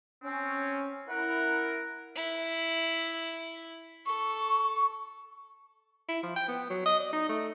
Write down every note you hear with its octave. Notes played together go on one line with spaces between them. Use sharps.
C4 C#4
E4 A#4 F#5
E4
A4 C#6
E4
F3
G5
B3
F#3
D#5
D5
D#4
A3